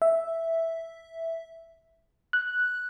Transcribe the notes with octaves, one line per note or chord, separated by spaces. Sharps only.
E5
F#6